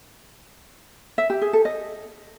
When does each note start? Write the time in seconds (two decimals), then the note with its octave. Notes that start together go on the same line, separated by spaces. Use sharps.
1.18 E5
1.30 G4
1.41 G#4
1.53 A4
1.65 D#5